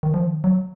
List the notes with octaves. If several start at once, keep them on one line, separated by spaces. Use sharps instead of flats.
D#3
F3
D#3
F#3